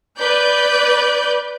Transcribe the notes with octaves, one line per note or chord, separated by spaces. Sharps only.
B4 D5 G6